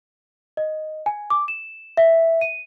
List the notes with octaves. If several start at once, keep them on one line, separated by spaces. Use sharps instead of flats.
D#5
G#5
D6
E7
E5
D#7